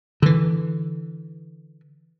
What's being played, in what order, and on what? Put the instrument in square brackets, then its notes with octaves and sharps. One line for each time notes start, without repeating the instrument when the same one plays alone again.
[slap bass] D3 E3